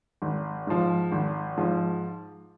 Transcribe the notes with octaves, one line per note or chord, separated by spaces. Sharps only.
G#1
G#2 F3
G#1
G#2 F3